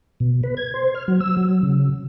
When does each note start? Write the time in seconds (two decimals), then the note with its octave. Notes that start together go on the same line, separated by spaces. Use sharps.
0.20 B2
0.43 B4
0.57 G#6
0.74 C5
0.95 F6
1.08 F#3
1.20 E6
1.37 F#3
1.63 C#3